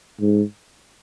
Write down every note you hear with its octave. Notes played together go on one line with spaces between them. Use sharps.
G#2